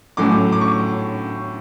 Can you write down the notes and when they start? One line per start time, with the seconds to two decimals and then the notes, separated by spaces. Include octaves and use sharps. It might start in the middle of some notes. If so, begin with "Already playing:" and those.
0.17 A2 F#3 A3 C#4 D6
0.52 D6
0.61 C#6